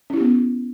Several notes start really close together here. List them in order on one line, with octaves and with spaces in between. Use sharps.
C#4 E4 G4 B3